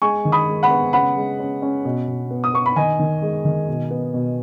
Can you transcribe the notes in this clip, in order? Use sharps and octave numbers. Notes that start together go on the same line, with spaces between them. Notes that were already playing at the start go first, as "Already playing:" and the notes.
G#3 G#5 C#6
D#3
B5 D#6
G#3
F#5 B5
B3
C#3 F#5 B5
G#3
C#4
C#4
B2
B2
B3
D#6
B3 C#6
B5
D#3 D#5 G#5
D#3
G#3
D#3
B2
B3
B2